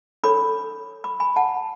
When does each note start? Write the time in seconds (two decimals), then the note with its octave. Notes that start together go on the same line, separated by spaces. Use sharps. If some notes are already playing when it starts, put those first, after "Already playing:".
0.23 D4 A4 C#5 B5 D6
1.04 B5 D6
1.20 G#5 B5
1.36 F#5 A5